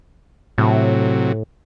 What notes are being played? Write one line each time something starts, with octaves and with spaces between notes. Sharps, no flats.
A2 C3 F#3